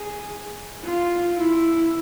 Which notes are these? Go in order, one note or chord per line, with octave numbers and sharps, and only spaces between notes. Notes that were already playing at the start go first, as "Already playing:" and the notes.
Already playing: G#4
F4
E4